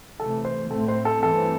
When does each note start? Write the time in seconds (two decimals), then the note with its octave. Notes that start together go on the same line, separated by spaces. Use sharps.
0.19 C3 E3 A3 A4
0.45 C5
0.71 A2 A3 C4 A4
0.88 C5
1.05 A4
1.23 G2 E3 A3 C4 A4